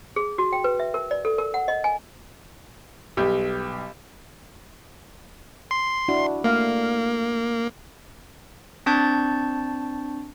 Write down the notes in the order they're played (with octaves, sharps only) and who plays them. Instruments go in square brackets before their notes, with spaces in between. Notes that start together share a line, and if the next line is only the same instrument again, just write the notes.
[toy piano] G#4
F#4
G5
B4
E5
A#4
D5
A4
A#4
F#5
D#5
G#5
[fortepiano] B1 G3 G4
[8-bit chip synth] C6
[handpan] D4 E4 F#4
[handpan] A3 F5 [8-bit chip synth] A#3
[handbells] C4 D4 A5 C#6 G6 A6